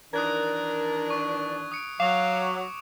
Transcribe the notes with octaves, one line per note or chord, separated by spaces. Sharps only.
D#3 E3 D4 A#4 D#6 F#6 G#6
C#6
D#6 C#7 D7
F#3 F5 D6 F7